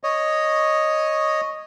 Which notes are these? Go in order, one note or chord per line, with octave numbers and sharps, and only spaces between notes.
C#5 D#5